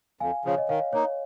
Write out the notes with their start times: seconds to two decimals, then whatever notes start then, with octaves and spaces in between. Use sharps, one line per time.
0.20 F2 F5 G#5
0.45 C#3 F3 C#5
0.58 D#5
0.69 D#3 C#5 F5
0.93 A#3 D#4 C#5